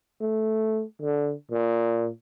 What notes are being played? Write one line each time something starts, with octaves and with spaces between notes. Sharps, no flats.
A3
D3
A#2